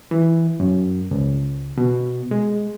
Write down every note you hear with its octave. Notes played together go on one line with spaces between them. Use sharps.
E3
F#2
C#2
B2
G#3